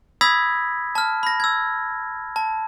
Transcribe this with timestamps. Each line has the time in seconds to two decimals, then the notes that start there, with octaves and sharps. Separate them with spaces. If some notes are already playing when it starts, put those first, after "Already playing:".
0.21 B5 D#6 E6 G#6 A#6 B6
0.95 A5 F6
1.23 B5 A#6
1.40 E6 G#6
2.36 A5